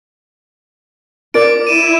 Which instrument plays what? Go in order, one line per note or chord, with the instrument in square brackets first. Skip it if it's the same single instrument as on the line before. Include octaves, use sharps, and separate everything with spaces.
[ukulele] F4 A#4 D5 [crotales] D6 D7
[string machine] E4 [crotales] D#7 E7